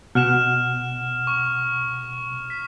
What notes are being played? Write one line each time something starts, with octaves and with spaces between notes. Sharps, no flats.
B2 F#5 F6 E7
C#6
B6